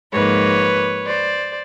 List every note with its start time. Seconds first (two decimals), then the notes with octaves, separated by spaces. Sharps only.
0.12 G#2 F3 A#3 B4 C#5
1.05 C5 D5